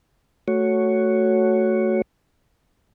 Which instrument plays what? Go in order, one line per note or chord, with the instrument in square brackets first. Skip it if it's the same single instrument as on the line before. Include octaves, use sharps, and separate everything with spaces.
[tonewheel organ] A3 F#4 C#5